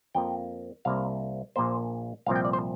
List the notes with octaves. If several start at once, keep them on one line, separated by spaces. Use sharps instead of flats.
F2 F3 A#3 G5
C2 C3 A#3 F5
A#1 A#2 A#3 C5
C2 A#2 F3 C4 F5
G5
D5
C5